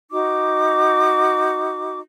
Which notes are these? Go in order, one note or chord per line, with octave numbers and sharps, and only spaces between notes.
D#4 F#4 D6